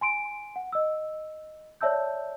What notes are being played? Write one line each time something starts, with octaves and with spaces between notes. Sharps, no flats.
G#5 C6 D7
F#5
D#5 E6
C#5 D5 E5 A5 E6 G6